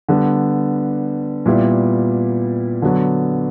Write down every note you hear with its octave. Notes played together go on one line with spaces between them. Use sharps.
D3 G3 B3
A#2 G3 B3 E4
D3 F#3 B3